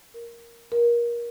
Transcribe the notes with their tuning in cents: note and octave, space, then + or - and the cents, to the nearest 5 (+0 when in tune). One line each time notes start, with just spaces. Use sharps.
A#4 +5
A#4 +25